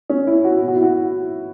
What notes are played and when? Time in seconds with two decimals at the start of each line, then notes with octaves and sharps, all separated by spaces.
0.10 C#4
0.27 E4
0.44 F#4
0.61 B2
0.68 F#4
0.76 E4
0.83 F#4